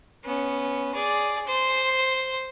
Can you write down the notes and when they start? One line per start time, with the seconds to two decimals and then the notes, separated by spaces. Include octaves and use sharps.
0.24 B3 C#4
0.94 G#4 D5
1.47 C5